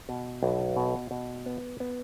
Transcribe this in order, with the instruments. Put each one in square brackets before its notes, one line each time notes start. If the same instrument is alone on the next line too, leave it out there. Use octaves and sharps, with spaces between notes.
[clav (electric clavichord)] B2
B1
B2
B2
B3
B3